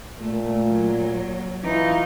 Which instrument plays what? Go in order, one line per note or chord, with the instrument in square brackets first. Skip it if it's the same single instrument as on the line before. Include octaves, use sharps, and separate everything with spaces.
[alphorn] A#2 [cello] A3
[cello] F#3
[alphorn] E3 [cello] D#4 F4